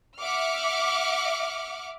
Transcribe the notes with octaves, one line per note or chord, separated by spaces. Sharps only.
E5 F#5 D6 F6